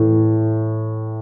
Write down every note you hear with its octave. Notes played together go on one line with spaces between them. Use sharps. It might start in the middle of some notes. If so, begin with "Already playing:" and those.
Already playing: A2 E3